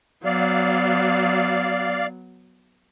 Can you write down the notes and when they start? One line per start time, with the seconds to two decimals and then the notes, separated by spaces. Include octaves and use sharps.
0.25 F#3 B3 D5 F5